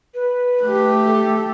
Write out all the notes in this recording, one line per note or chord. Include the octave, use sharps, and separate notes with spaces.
B4
A3 G4
A4